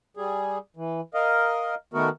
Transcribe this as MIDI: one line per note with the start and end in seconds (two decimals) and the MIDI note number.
0.17 0.58 55
0.17 0.58 68
0.76 1.01 52
1.14 1.75 70
1.14 1.75 75
1.14 1.75 77
1.94 2.09 51
1.94 2.09 57
1.94 2.09 59
1.94 2.09 66
1.94 2.09 70